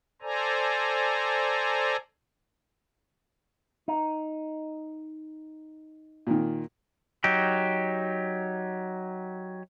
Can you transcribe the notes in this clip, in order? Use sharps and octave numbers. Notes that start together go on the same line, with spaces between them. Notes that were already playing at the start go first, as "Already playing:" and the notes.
A4 C5 D5 G#5 A#5
D#4
A#2 D#3
F#3 D#4 G4